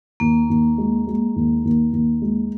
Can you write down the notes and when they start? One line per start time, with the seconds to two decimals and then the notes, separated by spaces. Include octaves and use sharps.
0.20 D#2 A#3
0.50 D#2
0.78 G#3
1.07 G#3
1.36 D#2
1.65 D#2
1.93 D#2
2.22 G#3